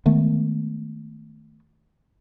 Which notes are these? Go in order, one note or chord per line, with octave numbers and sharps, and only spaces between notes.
D#3 G#3 A3 B3